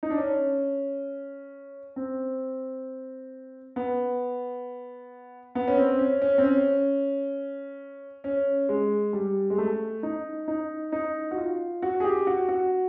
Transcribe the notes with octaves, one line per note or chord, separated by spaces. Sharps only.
D#4
D4
C#4
C4
B3
B3
C#4
C4
C#4
C#4
C4
C#4
C#4
G#3
G3
G#3
A3
D#4
D#4
D#4
F#4
F4
F#4
G#4
G4
F#4
F#4